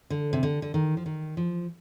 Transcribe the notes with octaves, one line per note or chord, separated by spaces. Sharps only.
D3
C3
D3
D3
D#3
F3
D#3
F3